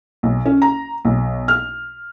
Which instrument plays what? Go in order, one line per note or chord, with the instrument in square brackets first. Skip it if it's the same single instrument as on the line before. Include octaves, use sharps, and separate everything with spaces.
[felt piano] B1
C#4
A#5
B1
F6